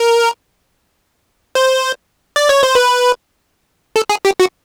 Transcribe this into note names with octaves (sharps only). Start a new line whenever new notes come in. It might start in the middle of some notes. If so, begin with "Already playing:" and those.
Already playing: A#4
C5
D5
C#5
C5
B4
A4
G#4
G4
F#4